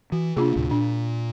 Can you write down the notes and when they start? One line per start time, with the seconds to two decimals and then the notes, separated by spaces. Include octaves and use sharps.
0.12 E3 F#4
0.36 C3 A#3 D4 F4 G#4
0.56 D2 A2 C3
0.71 A#2 D4